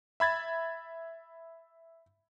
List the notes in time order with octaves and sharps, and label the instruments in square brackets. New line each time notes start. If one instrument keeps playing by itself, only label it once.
[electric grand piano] E5 B5 G#6 A6